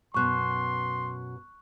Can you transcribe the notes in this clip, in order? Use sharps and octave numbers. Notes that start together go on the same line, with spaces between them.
F#2 B2 C6 C#6 F#6